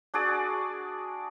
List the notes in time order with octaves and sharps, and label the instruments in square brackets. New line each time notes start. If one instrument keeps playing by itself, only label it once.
[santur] D4 F#4 G#4 D5